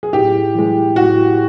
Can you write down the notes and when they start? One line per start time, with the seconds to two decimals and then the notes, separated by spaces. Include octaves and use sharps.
0.03 G#4
0.13 A2 G4
0.54 E3 G#3
0.96 A2 F#4